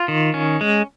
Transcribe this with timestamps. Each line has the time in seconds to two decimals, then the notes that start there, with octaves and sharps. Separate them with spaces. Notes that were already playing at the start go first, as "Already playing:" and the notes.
Already playing: F4
0.08 D#3
0.34 C#4
0.61 G#3